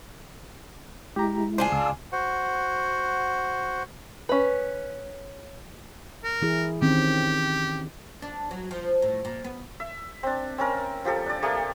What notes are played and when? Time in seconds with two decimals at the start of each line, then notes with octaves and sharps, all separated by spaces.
1.16 G#3 E4 G4 A#5
1.58 D4 F4 G#4 C5
1.72 C#2 A5 E6
2.12 F#4 C5 F#5
4.29 C#4 B4
6.24 A#4
6.42 E3 E4 G#4
6.82 D#3 C4 C#4 G4
8.22 D4
8.51 F#3
8.71 F3
9.02 A2
9.25 A#2
9.44 B3
9.80 E5
10.23 C4 D4
10.58 C4 C#4 A#4
11.05 F3 G4 A4
11.26 D4 D5
11.42 A3 A#3 G4